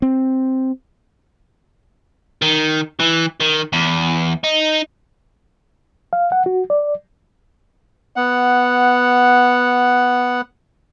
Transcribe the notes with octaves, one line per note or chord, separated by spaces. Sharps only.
C4
D#3
E3
D#3
E2
D#4
F5
F#5
F#4
D5
B3 F#5